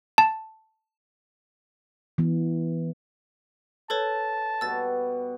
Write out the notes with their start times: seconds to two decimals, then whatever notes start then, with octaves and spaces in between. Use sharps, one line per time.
0.18 A5
2.18 E3 B3
3.90 A4 B4 C#5 A5
4.61 B2 G3 E6 A6